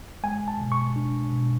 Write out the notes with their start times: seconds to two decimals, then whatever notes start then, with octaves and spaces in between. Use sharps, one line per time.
0.24 G#3 G#5
0.48 A5
0.60 B2
0.72 C#6
0.96 D4
1.32 B2